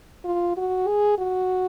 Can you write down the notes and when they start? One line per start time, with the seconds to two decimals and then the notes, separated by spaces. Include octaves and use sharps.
0.25 F4
0.57 F#4
0.87 G#4
1.18 F#4